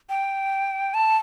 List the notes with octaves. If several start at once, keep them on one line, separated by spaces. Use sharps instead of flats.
G5
A5